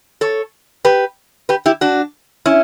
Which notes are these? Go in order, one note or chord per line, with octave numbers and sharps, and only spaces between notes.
A4 C#5
G4 B4
G4 B4
E4 G4
D4 F#4
C#4 E4